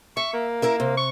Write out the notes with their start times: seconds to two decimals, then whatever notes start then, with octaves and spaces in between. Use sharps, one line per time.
0.17 E5 C#6
0.34 A#3
0.62 E4 A#4 E5
0.80 C3
0.97 C#6